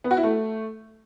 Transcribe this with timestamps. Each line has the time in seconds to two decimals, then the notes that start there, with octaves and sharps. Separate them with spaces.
0.04 B3
0.11 F#4
0.17 E4
0.23 A3